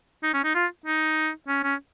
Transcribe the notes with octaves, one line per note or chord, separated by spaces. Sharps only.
D#4
C#4
D#4
F4
D#4
C#4
C#4